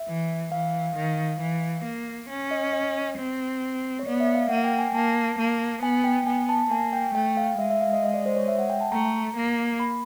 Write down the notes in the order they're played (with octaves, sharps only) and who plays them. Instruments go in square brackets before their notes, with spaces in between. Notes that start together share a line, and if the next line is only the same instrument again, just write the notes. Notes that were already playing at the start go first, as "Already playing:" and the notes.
Already playing: [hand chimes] E5
[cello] E3
[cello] E3 [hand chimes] F5
[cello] D#3
E3
A#3
C#4
[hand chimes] D#5
D#5
[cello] C4
[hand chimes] C#5
[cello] B3 [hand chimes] D5
[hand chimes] E5
F5
[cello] A#3 [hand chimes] F#5
[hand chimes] G5
G#5
[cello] A#3 [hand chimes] A5
[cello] A#3
[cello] B3 [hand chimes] G#5
[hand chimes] G5
[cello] B3 [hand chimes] G#5
[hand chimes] A5
[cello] A#3 [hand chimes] G#5
[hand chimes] G5
[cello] A3 [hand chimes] G5
[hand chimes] F5
[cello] G#3 [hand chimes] E5
[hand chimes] E5
F5
D#5
D#5
D5
C5
C#5
E5
F#5
G5
A5
[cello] A3 [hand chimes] A#5
[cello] A#3
[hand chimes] B5